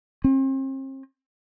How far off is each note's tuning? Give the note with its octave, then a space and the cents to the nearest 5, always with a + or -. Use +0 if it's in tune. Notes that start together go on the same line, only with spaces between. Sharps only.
C4 +40